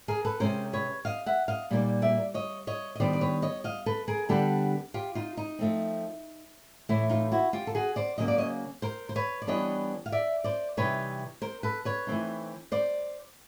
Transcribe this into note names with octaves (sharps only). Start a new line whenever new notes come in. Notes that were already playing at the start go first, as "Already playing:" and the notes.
G#4 A#4
A4 B4
C3 D#3 G#3 C#4 A#4 C5
B4 C#5
D#5 F5
E5 F#5
D#5 F5
A#2 G3 A#3 D#4
D5 E5
C#5 D#5
C#5 D#5
D#5
D#3 G3 B3 D4 C5 D5
D5
B4 C#5
C#5 D#5
D#5 F5
A4 B4
G#4 A#4
D3 G3 B3 D4 G4 A4
F4 G4
D#4 F4
D#4
F3 A3 C4
A2 E3 A3 E4
D#4 F4
E4 F#4
F4 G4
A4
F#4 G#4
C5 D5
C#3 F#3 A#3 C#4 D#5
D5
C#5 D#5
A#4 C5
C5
B4 C#5
D5
E3 G3 B3 D4 C#5 D#5
F5
D5 E5
C5 D5
C3 E3 G3 C4 D#4 B4 C#5
A#4 C5
A4 B4
B4 C#5
E3 A3 C4 D#4
C5 D5